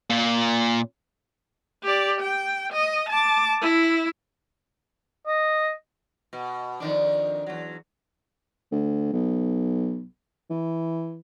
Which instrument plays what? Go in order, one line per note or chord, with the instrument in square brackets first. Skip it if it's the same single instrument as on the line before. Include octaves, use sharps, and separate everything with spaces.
[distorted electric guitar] A#2
[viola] G4 D5
G5
D#5
A5 D6
E4
[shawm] D#5
[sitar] B2
F2 D#3 D4
E2 F#3
[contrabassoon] D2
B1
E3